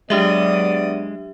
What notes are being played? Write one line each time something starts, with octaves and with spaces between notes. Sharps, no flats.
F#3 G#3 B3 D4 G4 D5 E5 D#6